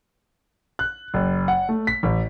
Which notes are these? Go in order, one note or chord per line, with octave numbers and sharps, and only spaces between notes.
F#6
F#1
F#5
A3
B6
A1